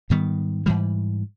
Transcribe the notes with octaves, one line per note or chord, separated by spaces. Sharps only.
G#2 D#3 G3 B3
G#2 E3 G3